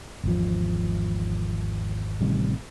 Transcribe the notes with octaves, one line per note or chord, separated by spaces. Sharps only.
G#1 E2 F3
A1 C3 D#3 G3